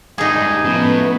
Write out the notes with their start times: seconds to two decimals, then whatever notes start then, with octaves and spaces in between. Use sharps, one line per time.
0.18 G#2 G3 D#4 G#4
0.65 A2 F3 B3 C#4